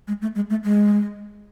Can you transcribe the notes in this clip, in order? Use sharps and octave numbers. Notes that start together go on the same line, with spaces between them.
G#3
A3
G#3
A3
G#3